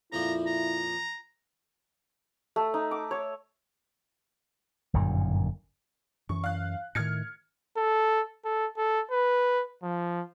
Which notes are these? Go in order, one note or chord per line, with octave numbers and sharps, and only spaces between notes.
F2 A#2 F3 E4 A#5
A#5
A3
D#4
D6
C#5
G1 F#2 A#2 D#3
F#2 E3 C#6
F5 F#6
A2 D#3 F6 G#6 C#7
A4
A4
A4
B4
F3